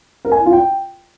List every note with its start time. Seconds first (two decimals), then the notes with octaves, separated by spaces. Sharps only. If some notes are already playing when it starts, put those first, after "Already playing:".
0.25 A#4
0.32 G#5
0.39 E4
0.46 F4
0.53 G5